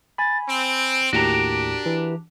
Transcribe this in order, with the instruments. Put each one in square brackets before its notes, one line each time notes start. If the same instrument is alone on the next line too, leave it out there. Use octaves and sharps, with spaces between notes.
[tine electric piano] G#5 B5 [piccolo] A6
[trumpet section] C4 [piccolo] D7
[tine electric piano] D#2 A2 [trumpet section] D4 [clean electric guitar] F#4 G4 A#4
[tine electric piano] E3